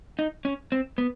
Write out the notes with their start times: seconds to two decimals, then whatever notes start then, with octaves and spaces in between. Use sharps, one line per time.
0.19 D#4
0.45 C#4
0.72 C4
0.98 B3